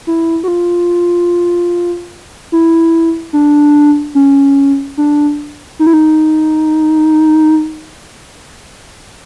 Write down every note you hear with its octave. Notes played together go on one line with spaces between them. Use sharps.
E4
F#4
F4
E4
D4
C#4
D4
D#4
E4
D#4